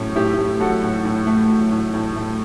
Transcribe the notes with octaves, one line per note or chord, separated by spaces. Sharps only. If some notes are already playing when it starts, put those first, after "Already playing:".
Already playing: A2 F#3 C#4
A2 E4 G4
A3
F#3 F#4 A4
A2
A2
A3
F#3
A2
A2
A3